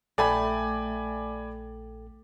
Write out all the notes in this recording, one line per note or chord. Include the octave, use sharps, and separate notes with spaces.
A#1 A3 A4 D5 G5 G#5 B5